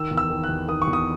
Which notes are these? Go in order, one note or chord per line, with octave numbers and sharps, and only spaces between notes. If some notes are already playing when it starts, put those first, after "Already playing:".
Already playing: D#3 E6
E2
E6
D#3
F#6
E2
D#3 D#6
C#6
E2
D#6